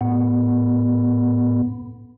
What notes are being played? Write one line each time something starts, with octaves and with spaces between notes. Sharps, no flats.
A2 B3